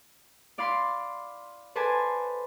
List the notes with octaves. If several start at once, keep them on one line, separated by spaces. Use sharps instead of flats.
E4 D5 F5 B5 C6
A4 B4 C5 D5 G#5 A5